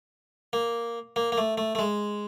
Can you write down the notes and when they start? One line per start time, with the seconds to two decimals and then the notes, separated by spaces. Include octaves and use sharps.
0.53 A#3
1.16 A#3
1.32 A#3
1.38 A3
1.58 A3
1.75 A3
1.79 G#3